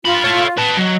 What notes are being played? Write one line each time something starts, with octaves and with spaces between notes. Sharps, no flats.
G2 F4 B5
A4 C#5
B4 A5
F#3 D#5